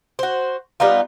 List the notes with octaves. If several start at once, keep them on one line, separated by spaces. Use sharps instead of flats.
F#4 C5
G3 B3 D#4 F4